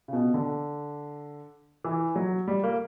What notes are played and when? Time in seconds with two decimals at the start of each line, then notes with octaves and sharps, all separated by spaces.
0.08 C#3
0.13 B2
0.34 D3
1.85 E3
2.16 F#3
2.48 G3
2.64 A#3